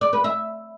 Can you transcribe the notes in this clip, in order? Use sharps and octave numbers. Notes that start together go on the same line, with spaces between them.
D5
B4
E5